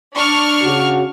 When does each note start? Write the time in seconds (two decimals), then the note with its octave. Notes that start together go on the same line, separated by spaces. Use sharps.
0.15 D4 C#6 F6
0.63 C#3 F#4